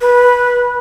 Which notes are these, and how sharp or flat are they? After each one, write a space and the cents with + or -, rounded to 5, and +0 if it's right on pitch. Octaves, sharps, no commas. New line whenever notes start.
B4 -15